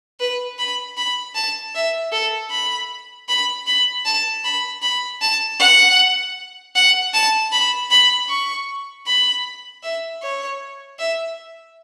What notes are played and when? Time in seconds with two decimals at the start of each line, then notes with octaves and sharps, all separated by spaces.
0.20 B4
0.59 B5
0.97 B5
1.35 A5
1.75 E5
2.12 A4
2.51 B5
3.29 B5
3.67 B5
4.05 A5
4.44 B5
4.82 B5
5.21 A5
5.60 F#5
6.75 F#5
7.14 A5
7.52 B5
7.90 B5
8.29 C#6
9.07 B5
9.83 E5
10.22 C#5
10.99 E5